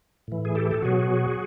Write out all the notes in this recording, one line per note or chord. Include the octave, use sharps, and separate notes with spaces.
A2 E3
G#4
G4 A4
A4
B2 F#3 F#4 G#4